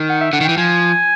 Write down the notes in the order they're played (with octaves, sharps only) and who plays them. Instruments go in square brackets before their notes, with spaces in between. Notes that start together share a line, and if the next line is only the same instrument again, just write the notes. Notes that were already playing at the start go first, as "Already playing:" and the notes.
Already playing: [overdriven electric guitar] D#3
[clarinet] F#5
E5
[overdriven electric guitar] D3 [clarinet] F#5
[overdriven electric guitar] D#3
[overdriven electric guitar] E3 [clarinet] G5
[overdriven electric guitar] F3 [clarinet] G#5